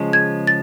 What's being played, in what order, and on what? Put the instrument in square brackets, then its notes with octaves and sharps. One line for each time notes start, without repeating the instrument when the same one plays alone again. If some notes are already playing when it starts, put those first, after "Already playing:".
Already playing: [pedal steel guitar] C#3 F3 G#3
[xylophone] G#6
A6